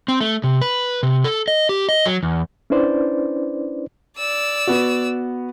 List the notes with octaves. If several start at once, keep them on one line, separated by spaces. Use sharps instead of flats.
C4
A3
C3
B4
C3
A4
D#5
G4
D#5
F#3
E2
C#4 D4 E4 B4 C5 D5
D5 E6
B3 F#4